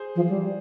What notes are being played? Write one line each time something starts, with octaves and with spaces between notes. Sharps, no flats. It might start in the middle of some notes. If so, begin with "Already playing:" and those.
Already playing: G#4 C5
F3
G3